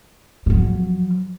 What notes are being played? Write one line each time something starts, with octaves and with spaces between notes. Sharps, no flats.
F3 F#3